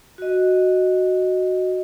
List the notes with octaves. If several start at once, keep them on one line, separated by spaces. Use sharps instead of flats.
F#4 D#5